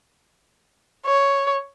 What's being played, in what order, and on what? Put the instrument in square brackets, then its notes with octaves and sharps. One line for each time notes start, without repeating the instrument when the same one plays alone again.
[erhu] C#5